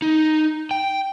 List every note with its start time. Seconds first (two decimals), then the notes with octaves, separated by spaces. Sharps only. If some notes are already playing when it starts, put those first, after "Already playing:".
0.02 D#4
0.71 G5